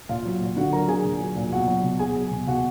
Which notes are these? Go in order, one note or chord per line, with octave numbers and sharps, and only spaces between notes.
A#2 F4 F5
F#3
A#2
D3 F#4 F#5
F#3 A#4 A#5
D3 G#4 G#5
A#2
F#3
A#2
B2 F#4 F#5
F#3
B2
B2 G#4 G#5
F#3
B2
B2 F#4 F#5